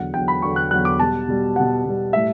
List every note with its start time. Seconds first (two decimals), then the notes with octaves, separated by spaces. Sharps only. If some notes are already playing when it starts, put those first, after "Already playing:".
Already playing: E2 D3 F#3 F#5
0.14 E2 D3 F#3 G5
0.28 B5
0.42 E2 D3 F#3 C#6
0.56 F#6
0.71 E2 D3 F#3 F#6
0.85 D6
0.99 B2 G3 A5
1.28 B2 G3
1.56 B2 G3 F#5
1.85 B2 G3
2.13 A2 G3 E5